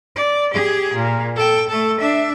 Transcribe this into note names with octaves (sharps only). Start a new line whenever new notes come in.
D5
G4 G#4
A#2
A4 G5
A3 A4
D4 E5